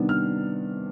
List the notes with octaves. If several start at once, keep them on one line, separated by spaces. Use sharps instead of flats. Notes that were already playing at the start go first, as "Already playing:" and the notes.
Already playing: C3 D#3 G3 B3 D4
F6